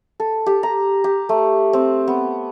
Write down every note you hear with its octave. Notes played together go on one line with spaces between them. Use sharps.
A4
G4
A#5
G4
A3
C4
B3